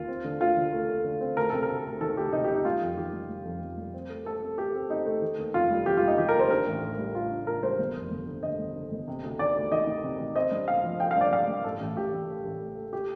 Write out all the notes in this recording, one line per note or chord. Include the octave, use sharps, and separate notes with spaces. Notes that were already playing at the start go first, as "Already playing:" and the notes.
Already playing: D#2 F4
C4
D3
D2 F4
D3
A3
A3
D3
C4
D2 A#4
C3 A4
A#4
D2
D2
D#3 A4
D2 G4
C3 D#4
C3 G4
D#4
G3 F4
F2
D#3 G4
G3
G3
F2
F2
G3
C4
A3
A3 A4
C4
A3 G4
C4
C4 D#4
A3
D#3
D#2
F1 F4
G3
F1 G4
F4
G3
D#4
D#3 G4
A#4
D#2 C5
D4 A#4
A1
A2
G3
A2 F4
D4
A2 A#4
G3 C5
G1
F2
G1
D3
D3 D#5
G1
D3
G1
C3
D2
D#3 D5
D2
D#3 D#5
D#3
C3
D#3
C4 D#5
G2
C4 F5
F3
F3 G5
F5
G2 D5
G2 F5
G2
A2 A4
A1
A1 G4
A1
A3
A1
A2
A3
G4